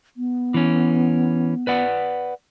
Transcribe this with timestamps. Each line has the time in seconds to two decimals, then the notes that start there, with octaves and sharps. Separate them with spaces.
0.17 B3
0.54 E3 C#4
1.67 B4 D5 F#5